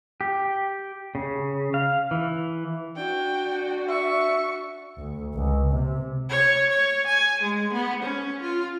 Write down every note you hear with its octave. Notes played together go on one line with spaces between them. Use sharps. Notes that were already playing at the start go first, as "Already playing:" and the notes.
G4
C#3
F5
E3
D4 F#4 G5
E5 C#6
D2
C#2
C3
C#5
C#5
G#5
G#3
B3
C#4
F4